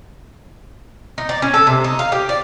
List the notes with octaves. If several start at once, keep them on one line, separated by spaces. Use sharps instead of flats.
D#4
D5
C#4
A4
C3
D#4
F5
G4
D5